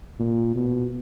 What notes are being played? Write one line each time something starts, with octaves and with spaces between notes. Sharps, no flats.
A#2
B2